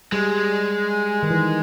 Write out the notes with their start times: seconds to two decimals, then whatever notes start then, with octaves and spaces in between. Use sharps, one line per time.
0.12 G3 G#3
1.23 D#3
1.30 E3